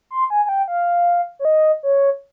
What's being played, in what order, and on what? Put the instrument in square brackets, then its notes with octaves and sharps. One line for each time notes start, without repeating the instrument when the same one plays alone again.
[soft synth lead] C6
G#5
G#5
G5
F5
C#5
D#5
C#5